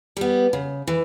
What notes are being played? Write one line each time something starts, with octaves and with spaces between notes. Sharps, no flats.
G3 B3
C#3
E3